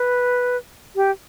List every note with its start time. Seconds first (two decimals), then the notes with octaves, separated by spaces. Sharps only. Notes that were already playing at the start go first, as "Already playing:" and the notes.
Already playing: B4
0.96 G4